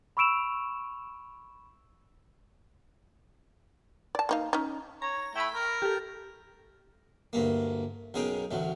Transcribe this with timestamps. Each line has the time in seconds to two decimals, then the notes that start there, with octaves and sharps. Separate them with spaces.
0.17 B5 C#6 E6 D7 E7 F7
4.15 D5 A5
4.29 A#3 D#4 F5
4.53 C#4 D#4
5.02 C#5 A#5
5.36 A3 E4 G5 B5
5.54 A#4
5.82 G4 A4
7.33 D2 G2 A#3
8.14 B1 C#3 G#4 A#4 G5
8.51 A1 D2 F#3